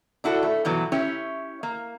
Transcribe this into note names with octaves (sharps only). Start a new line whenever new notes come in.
D4 E4 F#4 A4
A3
G2 B2 E3 F#3
C#4 E4 G4 C#5
A#3